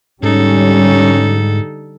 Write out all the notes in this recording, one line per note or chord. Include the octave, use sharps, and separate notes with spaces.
G#2 D3 G3 C#4 D#4 A4